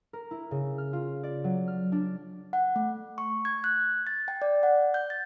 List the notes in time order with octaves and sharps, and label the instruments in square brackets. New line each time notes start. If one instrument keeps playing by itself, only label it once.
[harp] A#4
E4
C#3
F6
F4
D5
F#3
F6
D4
[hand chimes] F#5
A3
C#6
G#6
F#6
A6
G5
D5
F#5
G6
A6